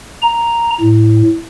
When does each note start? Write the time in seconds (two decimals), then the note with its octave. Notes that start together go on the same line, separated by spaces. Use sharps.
0.22 A#5
0.81 A2